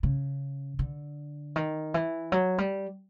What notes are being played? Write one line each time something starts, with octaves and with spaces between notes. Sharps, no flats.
C#3
D3
D#3
E3
F#3
G3